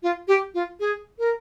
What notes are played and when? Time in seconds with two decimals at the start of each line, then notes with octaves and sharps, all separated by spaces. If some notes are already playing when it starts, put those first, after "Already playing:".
0.03 F4
0.28 G4
0.54 F4
0.80 G#4
1.19 A#4